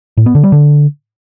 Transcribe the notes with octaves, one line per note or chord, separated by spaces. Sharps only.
A2
B3
D3
G3
D3